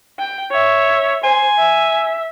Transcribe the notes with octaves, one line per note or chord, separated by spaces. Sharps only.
G5
C#5 E5
C5 G#5
E5